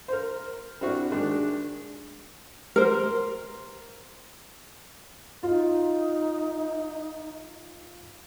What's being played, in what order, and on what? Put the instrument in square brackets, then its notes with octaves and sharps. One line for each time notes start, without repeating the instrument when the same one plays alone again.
[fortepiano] A#4 C5
C4 D4 E4 F#4
D#3 G#3 D4
[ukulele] A#4 C5
[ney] D#4 [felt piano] F4